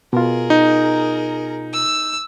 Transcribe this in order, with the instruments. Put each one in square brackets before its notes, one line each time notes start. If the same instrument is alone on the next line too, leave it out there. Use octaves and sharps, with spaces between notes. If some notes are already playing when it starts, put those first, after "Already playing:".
[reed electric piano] B2 F4 [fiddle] G#4 A#4
[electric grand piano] D#4
[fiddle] E6